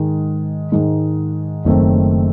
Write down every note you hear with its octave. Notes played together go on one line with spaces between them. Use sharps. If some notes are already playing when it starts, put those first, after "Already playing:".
Already playing: G#2 D#3 G#3 D#4
G#2 D#3 G#3 D#4
F#1 F#2 D#3 A3 C4